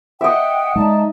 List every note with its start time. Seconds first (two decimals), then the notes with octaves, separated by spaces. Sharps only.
0.21 D#5 E5 F#5 G5
0.76 G#3 D#4 D5 A5